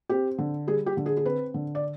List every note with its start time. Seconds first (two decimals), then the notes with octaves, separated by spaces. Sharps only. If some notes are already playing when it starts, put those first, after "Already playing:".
0.09 C4 G4
0.38 D3
0.67 G3 G#4
0.86 G4
0.97 D3
1.06 G#4
1.17 G#4
1.25 C4 B4
1.54 D3
1.75 D5